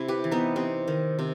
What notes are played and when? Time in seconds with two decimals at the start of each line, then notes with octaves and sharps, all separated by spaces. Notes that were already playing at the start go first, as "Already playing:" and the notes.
Already playing: C3 E4
0.08 G4 B4
0.24 E3
0.32 B3 D#4
0.56 C3 C4
0.88 D#3
1.19 C3